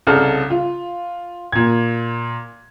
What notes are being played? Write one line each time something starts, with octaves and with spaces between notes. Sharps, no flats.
C2 C#3 A4 F6
F4
A#2 G#6